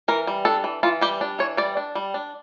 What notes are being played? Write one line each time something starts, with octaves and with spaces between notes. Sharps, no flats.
E3 A#4
G3
D4 A4
E3
E3 F4
G3 G4
D4
E3 C#5
G3 D5
D4
G3
D4